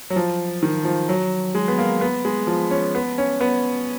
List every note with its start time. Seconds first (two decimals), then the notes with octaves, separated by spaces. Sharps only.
0.10 F#3
0.16 F3
0.63 D#3
0.85 F3
1.09 F#3
1.55 G#3
1.68 B3
1.79 A#3
2.01 B3
2.25 G#3
2.47 F3
2.71 C#4
2.95 B3
3.18 C#4
3.41 B3